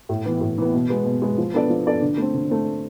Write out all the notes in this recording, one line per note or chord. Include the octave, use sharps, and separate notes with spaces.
A2
E3 B3
A2
E3 B3
B2
G#3 B3
B2
G#3 B3
F3
B3 D4 A4 D5
F3
B3 D4 A4 D5
D3
A3 C4
D3
A3 C4